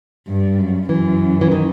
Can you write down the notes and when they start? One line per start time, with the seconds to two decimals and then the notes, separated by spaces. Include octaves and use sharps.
0.27 G2
0.58 F#2
0.89 F#2 E3
1.41 E3
1.51 D#3